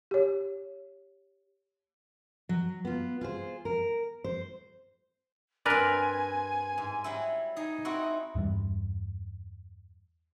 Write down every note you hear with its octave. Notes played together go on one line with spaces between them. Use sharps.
G4 C#5
F#3
B3 F4
F4 G#4 C5
A#4
C5
G2 C4 A#4 B4 D5 G#5
G#2
F#3 G3 E4
D#4 G#4
C4 E4 F#4
E2 G2 E3 G3